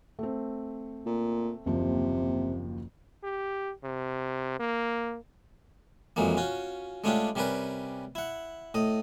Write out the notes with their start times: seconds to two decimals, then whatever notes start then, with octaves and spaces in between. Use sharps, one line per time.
0.19 A3 C4
1.06 A#2
1.66 F#1 D#2 C3 F3
3.24 G4
3.83 C3
4.60 A#3
6.16 F2 E3 F#3 G#3 A#3
6.37 C#4 F4 F#4
7.04 G#3 A3 C#4 D4 F4 G4
7.36 C3 G3 C#4 A#4 B4
8.15 E4 F#5
8.74 A2 D#5